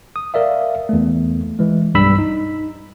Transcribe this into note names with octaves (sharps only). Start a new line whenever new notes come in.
D#6
A#4 D5 E5 F5
E2 A3
E3 G#3
B1 G2 G3 B5 E6 B6
D#4